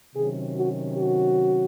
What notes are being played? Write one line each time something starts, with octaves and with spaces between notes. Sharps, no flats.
C3 D#3 F#3 C#4 G#4
F#4
F#4